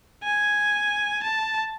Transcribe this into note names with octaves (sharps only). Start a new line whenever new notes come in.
G#5
A5